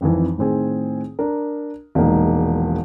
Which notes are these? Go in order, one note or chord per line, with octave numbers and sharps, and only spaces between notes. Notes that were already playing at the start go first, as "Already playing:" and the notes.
G#1 F2 D#3 E3
A2 D#3 C4 G#4
D4 A#4
E1 A#1 D#3 G#3 A#3 D#4